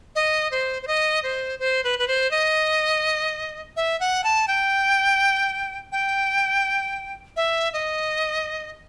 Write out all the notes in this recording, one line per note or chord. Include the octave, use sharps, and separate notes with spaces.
D#5
C5
C5
D#5
C5
C5
B4
B4
C5
D#5
E5
F#5
A5
G5
G5
E5
D#5